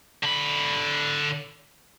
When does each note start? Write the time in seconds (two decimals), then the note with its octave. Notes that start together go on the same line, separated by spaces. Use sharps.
0.24 D3 B5